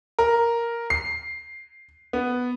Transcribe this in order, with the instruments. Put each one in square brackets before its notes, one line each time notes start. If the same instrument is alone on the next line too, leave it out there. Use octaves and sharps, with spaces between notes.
[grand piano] A#4
C7
B3